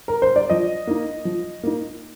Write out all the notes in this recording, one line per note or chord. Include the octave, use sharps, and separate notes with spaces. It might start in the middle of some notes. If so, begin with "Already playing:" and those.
A#4
C5
D5
F3 D#5
A#3 D#4
F3
A#3 D#4